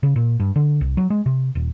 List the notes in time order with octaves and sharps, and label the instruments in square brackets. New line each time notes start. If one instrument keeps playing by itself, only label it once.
[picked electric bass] C#3
A#2
G2
D3
C2
F#3
G#3
C3
D#1